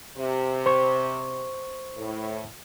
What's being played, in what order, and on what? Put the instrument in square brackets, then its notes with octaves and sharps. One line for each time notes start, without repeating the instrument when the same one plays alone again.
[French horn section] C3
[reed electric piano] C5 C#6
[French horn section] A2